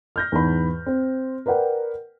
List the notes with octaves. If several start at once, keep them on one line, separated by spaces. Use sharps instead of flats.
F6 G6 A#6
E2 G#2 B5
C4
A#4 B4 D5 F#5 G5